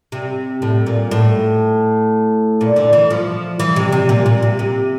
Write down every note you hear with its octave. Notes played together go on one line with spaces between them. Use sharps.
C3
A2
A#2
A2
A#2
D3
E3
F3
E3
C3
C3
A#2
A#2
C3
C3